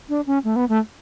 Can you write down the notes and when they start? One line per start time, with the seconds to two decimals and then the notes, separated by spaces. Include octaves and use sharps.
0.09 D4
0.27 C#4
0.44 A3
0.56 B3
0.69 A3